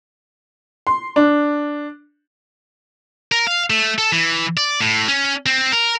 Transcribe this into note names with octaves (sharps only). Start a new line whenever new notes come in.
C6
D4
A#4
F5
A3
A4
E3
D5
A2
C#4
C4
A#4